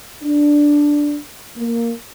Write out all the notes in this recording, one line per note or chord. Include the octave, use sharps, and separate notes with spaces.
D4
A#3